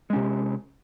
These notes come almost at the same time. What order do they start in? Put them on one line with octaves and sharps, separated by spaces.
G#3 C#4 C3